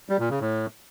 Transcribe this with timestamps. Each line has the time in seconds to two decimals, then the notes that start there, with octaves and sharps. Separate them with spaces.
0.09 G3
0.20 A#2
0.30 C#3
0.41 A2